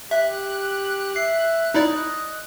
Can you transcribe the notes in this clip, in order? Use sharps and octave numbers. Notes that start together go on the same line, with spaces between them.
G4 E5 F#6
E5 C7
D#4 E4 D5 D#5